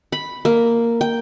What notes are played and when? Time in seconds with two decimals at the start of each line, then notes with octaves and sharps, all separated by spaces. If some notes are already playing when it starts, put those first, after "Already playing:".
0.12 B5
0.45 A#3
1.01 G5